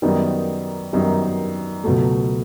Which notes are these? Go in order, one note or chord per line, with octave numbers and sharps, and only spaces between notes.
F#2 D#3 G3 B3 D#4
F#2 D#3 G3 B3 D#4
C#2 B2 F#3 A3